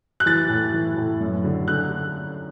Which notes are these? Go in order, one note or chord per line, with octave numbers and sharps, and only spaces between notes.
F#6
E3 A6
A2
E3
A2
F#2
D3
D3 F#6